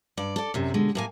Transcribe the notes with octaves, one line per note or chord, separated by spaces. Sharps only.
G2 D5
A4 D5
F#2 C3
B2 D3 G#3
A2 A#3 G#5